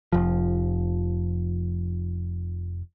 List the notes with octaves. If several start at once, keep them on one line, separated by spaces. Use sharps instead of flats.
F1 F3